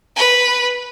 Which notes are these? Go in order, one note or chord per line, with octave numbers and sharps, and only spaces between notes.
B4